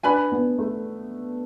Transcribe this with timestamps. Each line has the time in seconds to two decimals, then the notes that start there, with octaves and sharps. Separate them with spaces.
0.03 D4 B4 D5 G#5 B5
0.32 B3
0.58 A3